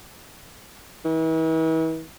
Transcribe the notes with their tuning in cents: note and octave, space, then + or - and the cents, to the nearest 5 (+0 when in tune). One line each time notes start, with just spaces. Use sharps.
E3 -40